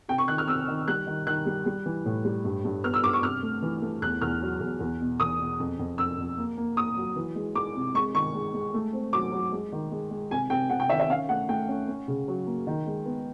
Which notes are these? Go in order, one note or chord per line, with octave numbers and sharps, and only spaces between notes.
C3 G5
C#6
D#3 F#6
F6
C3 E6
D#3
G3 F#6
D#3
D#3 F#6
G3
G3
E3
A2
G3
G2
G2
B3 F6
E6
G2 D6
C#6
C3 F6
A3
E3
A3
E2 F#6
E2 F6
F#3
E2
E2
B2
E2 D#6
B2
F2
F2
F2 E6
F2
A#3
A#3
A#3 D#6
F#3
E3
G#3
G#3 D6
C3
G#3 C#6
D#3 C#6
G#3
G#3
A3
C4
F#3 D6
F#3
G#3
D#3
G#3
G#3
C3 G#5
C3 G5
C3 F#5
G5
D#3 E5
E5
C#4 F5
A3 F#5
A3 G5
C#4
C#4
C#3
F#3
A#3
D#3
G#3
B3